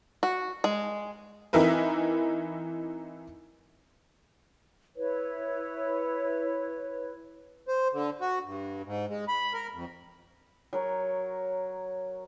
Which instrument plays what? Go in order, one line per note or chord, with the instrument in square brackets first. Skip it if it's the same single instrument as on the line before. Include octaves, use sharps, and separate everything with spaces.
[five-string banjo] F#4
G#3
[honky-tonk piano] E3 C4 D#4 E4 A#4 B4
[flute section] E4 B4 C#5
[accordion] C5
D3
F#4
G2
G#2
G#3
B5
A#4
F2
[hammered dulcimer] F#3 A#4 C#5